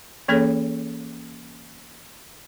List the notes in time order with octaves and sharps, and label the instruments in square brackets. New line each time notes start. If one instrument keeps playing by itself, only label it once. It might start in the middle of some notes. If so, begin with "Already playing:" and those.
[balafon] E3 A#3 C#4 G#4 A4 C#5